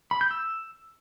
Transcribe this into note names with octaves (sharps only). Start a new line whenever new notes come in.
B5
G6
E6